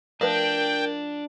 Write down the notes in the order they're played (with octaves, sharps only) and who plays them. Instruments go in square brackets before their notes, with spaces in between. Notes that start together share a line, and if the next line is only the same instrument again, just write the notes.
[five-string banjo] F3 A3 B4 [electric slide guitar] D4 [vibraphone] A#4 [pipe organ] G5